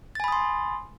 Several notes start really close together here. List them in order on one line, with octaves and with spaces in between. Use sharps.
A6 G#5 B5 D#6 C6